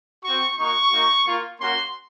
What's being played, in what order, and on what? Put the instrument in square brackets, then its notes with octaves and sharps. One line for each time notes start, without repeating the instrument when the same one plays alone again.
[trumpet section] C4 F#4 C#6
A#3 D#4 F#4 C#6
A#3 D#4 F#4
A#3 F4
A#3 C#4 F#4 C6